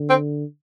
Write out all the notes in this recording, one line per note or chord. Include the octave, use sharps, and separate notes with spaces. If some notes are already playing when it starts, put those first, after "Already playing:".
Already playing: D3
C4